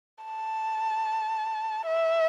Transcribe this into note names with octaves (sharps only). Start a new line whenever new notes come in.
A5
E5